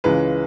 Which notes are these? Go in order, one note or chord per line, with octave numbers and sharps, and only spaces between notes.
C#2 C#3 E3 G#3 B4